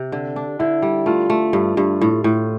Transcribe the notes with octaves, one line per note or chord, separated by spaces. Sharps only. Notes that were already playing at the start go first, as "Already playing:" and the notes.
Already playing: C3
D3
D4
D3 E4
G3
A3 F4
A3
G2
G2
A2
A2